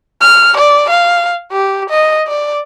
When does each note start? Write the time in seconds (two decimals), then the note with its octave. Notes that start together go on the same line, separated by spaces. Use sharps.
0.21 F6
0.58 D5
0.90 F5
1.52 G4
1.90 D#5
2.28 D5